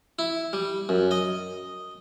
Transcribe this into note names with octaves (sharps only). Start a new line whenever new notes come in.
E4
G3
F#2
D#5